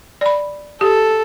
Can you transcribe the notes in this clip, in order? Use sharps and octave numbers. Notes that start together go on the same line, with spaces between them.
D5 B5
G4 A4